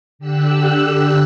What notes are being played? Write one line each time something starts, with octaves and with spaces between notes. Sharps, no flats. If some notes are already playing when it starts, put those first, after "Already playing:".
D3 G4 E6 F#6